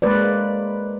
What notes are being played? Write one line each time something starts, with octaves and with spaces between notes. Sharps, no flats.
G#3 A#3 B4 C5 D5